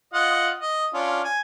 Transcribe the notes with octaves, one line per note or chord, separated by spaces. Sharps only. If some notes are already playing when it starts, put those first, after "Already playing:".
F4 D#5 F#5
D#5
C#4 D4 F4
G#5